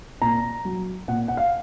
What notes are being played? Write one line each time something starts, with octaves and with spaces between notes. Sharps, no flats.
A#2 A#5
F#3
A#2 F#5
F#5
F5